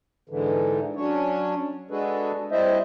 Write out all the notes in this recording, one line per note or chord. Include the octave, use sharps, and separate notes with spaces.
G#2 D3 E3
F#3 C#4 D4 C#5
G#3 D4 F#4 G#4 A4 B4
G3 C4 E4 C5 D#5 E5